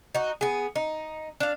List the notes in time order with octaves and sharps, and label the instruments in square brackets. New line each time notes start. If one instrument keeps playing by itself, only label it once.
[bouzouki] D#4 F#4
B3 G#4
D#4
D4 F5